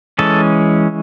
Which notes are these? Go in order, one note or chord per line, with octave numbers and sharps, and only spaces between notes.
E3 G#3 C#4 A4